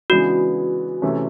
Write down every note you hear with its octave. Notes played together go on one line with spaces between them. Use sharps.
C#3 E3 G#3 B3 D4 F#4
C3 E3 A3 C#4